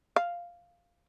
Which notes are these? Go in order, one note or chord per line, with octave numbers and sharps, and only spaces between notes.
F5